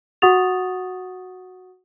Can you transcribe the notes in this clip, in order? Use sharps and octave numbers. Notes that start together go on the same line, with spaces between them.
F#4 F#5 C#6 D#6 A6 F7